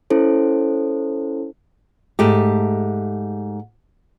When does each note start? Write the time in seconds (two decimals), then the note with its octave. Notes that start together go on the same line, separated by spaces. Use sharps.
0.10 C#4 E4 A4 C5
2.19 G#2 A3 G4